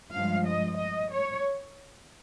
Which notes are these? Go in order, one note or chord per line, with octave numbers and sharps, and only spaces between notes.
G2 F3 G#3 F5
D#5
D#5
C#5